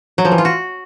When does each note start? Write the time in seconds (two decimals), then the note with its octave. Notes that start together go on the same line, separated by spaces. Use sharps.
0.18 F#3
0.25 F3
0.31 E3
0.38 F4
0.45 F#4